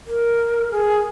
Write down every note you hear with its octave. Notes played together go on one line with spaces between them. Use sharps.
A#4
G#4